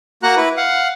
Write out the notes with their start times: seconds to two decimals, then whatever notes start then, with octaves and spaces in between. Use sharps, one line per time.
0.23 A#3 F#4 F#5 A#5 F#6
0.36 E4 B4
0.57 F5 F#5